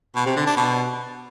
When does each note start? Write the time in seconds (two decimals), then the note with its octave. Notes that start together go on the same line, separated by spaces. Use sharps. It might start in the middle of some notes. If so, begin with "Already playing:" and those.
0.15 B2
0.26 C3
0.36 D3
0.46 D4
0.56 B2